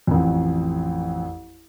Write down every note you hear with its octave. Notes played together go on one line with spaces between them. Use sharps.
A1 F2